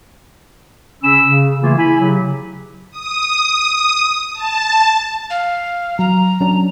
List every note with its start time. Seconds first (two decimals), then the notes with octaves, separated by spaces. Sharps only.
1.03 C#3 C#4 B5 E6
1.27 C#3
1.62 C#3 E3 A3 A#3 F4 G#4
1.77 E4 G#5 B5
2.00 C#3 F#3 G4
2.91 D#6
4.33 A5
5.30 F5
5.99 F#3 A#5
6.41 F#3 C#4 D4